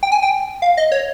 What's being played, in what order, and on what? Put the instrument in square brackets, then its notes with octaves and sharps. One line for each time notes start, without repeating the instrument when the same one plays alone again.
[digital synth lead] G5
G#5
G5
F5
D#5
C#5